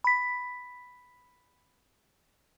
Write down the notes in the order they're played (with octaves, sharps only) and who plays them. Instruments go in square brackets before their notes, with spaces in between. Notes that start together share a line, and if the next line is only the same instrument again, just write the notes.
[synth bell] B5 B6